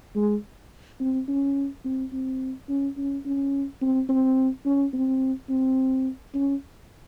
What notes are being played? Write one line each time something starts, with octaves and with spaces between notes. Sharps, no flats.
G#3
C4
C#4
C4
C4
C#4
C#4
C#4
C4
C4
C#4
C4
C4
C#4